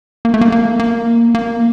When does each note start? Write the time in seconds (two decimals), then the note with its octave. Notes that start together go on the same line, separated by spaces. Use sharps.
0.25 A#3
0.34 A3
0.41 A#3
0.52 A#3
0.80 A#3
1.35 A#3